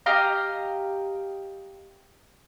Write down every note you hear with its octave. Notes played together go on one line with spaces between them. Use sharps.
G4 D#5 F5 A#5